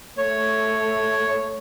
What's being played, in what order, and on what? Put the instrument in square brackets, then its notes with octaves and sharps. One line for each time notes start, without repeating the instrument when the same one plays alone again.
[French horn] A3 [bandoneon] C#5